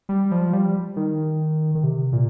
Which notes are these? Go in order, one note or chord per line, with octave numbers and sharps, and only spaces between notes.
G3
F3
G3
D#3
D#3
C3
A#2